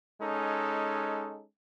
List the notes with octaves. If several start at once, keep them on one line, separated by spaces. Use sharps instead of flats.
G#3 C#4 D#4 A4